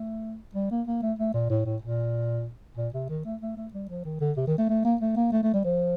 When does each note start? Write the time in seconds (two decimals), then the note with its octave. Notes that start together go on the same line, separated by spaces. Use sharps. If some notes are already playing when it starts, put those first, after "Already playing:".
Already playing: A3
0.55 G3
0.71 A#3
0.87 A#3
1.02 A3
1.19 A3
1.34 A#2
1.50 A2
1.65 A2
1.82 A#2
2.77 A#2
2.94 C3
3.09 D#3
3.25 A3
3.41 A3
3.56 A3
3.73 G3
3.89 F3
4.05 D#3
4.21 D3
4.37 C3
4.47 D#3
4.58 A3
4.69 A3
4.85 A#3
5.01 A3
5.16 A#3
5.32 A3
5.43 A3
5.54 G3
5.64 F3